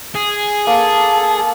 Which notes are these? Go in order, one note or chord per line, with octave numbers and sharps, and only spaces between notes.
G#4
A#3 A4